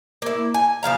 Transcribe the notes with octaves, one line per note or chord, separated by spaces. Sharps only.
A#3 E4
G#5
C#3 F3 F5 A#5